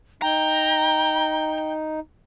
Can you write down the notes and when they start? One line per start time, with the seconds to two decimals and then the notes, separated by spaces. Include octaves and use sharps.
0.22 D#4 G5 A#5